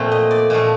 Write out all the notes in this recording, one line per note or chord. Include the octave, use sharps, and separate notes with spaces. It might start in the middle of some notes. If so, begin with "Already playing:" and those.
Already playing: F2 A#2 A3 C4
D#5
D5
A#2 F3 A3 D#5